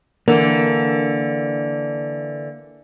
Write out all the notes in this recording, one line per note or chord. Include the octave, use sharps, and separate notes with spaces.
D3 E3 A#3